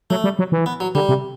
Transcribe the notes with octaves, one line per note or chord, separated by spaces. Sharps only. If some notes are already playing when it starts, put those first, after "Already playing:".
F#3 A3
G3
F#3
E3
B3
F#3
D3 G3
C3